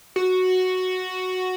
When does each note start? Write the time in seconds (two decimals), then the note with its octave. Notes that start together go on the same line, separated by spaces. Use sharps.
0.16 F#4